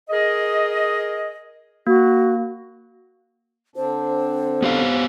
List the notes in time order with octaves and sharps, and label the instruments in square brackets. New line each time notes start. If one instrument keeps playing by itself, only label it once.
[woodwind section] G#4 A#4 D#5
[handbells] A#3 [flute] F#4
[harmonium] D3 C4 D4 [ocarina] C5
[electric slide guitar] B3 G4 F5